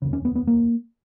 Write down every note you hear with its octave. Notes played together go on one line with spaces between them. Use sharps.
F1 D#2 C#3
C#4
B3
B3
A#3